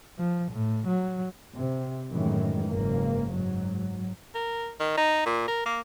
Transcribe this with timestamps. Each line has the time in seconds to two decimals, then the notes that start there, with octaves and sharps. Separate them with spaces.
0.18 F3
0.52 A2
0.87 F#3
1.56 C3
2.11 F#2 A2 D#3 E3 G#3
2.68 F#1 G#2 A#3
3.32 G#2 F#3
4.35 A#4
4.80 D#3
4.98 D#4
5.26 A#2
5.48 A#4
5.66 A#3